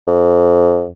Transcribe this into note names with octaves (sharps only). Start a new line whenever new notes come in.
F2